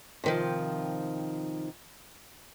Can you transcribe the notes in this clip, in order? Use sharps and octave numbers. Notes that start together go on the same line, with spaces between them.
C3 D#3 F3